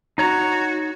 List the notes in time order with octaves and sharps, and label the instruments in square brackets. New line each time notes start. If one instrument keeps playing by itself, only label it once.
[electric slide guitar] D#4 C#5 A#5 [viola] F#4